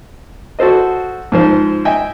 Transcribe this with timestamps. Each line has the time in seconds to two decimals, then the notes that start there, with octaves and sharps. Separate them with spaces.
0.59 F#4 A4 C5 D#5
1.32 G#2 F3 C5
1.85 D#5 E5 G5 G#5